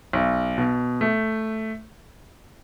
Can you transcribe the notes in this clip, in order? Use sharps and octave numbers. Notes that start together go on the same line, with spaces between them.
B1
B2
A3